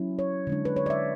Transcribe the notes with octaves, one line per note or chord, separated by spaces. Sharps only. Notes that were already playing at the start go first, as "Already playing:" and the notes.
Already playing: F#3 C#4 E4
C#5
D3 G#3 D4
B4
C#5
D5
E5